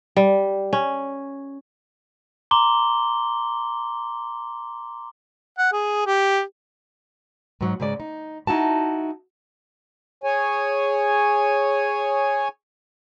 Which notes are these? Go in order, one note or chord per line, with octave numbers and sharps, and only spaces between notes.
G3
C#4
A#5 C6 D6 G7
F#5
G#4
G4
G#2 F#3
G#2 C#3 G#3 D5
D#4
D#4 E4 F#4 A5
G#4 C#5 G#5